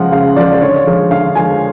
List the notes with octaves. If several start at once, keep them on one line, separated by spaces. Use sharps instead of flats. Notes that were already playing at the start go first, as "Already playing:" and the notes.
Already playing: C#3 F3 G#3 F#5
C#3 F5
F3 G#3 D5
D5
D3 C#5
F3 G#3
D3 F5
F3 G#3 G#5